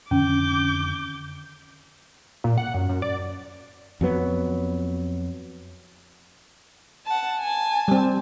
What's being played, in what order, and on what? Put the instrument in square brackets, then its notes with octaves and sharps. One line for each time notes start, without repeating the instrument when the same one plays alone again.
[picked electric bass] F2 D3 D#3 [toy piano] C#4 [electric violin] D6 G6
[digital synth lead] A#2
F#5
F#2
F#2
D5
[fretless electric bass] F2 F#3 B3
[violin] F#5 A5
G#5 A5
[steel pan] G3 C4